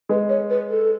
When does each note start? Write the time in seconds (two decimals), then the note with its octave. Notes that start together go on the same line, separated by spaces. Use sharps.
0.09 G#3 B4
0.29 C#5
0.50 B4
0.71 A4